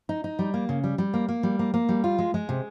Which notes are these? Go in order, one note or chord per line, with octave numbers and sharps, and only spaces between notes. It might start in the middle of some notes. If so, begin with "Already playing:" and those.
D#4
D#4
G3
A#3
C#3
G3
G3
A#3
A#3
G3
A#3
A#3
G3
F4
G#3
G#3
C3